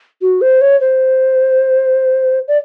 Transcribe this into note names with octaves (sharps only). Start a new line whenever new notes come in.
F#4
C5
C#5
C5
D5